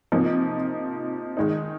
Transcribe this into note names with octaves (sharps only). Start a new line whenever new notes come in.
C3 F3 A#3 D#4
D#3 G#3 D#4